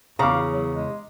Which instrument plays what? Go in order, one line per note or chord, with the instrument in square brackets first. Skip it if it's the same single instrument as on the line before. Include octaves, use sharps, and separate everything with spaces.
[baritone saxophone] E2 [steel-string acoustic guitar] C#3 [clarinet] F5 [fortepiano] A#5 D6
[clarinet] F#3
G#3